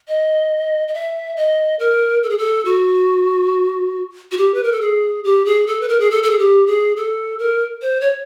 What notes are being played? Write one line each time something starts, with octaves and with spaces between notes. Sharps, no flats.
D#5
D#5
E5
D#5
A#4
A4
G#4
A4
F#4
F#4
G4
B4
A#4
A4
G#4
G4
G#4
A4
B4
A#4
G#4
A4
A4
G#4
G4
G#4
A4
A#4
C5
C#5